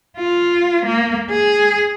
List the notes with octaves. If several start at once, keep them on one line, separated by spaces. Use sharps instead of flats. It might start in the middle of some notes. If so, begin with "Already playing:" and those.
F4
A#3
G#4